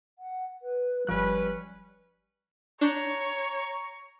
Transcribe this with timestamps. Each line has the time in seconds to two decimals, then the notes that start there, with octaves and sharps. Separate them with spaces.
0.19 F#5
0.62 B4
1.07 G1 F3 G3 C#4 B4 F#6
2.81 D4 C#5 A#5 C#6 G6